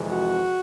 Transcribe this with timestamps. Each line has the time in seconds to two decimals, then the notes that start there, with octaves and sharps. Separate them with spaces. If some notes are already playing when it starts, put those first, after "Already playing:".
Already playing: F2 C3 E3 G#3
0.11 F#4